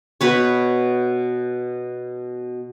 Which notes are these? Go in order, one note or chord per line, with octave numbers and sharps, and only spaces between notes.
B2 B4 C#5